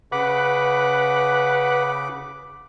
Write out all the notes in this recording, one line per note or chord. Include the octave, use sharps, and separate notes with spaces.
C#3 B4 F#5 D6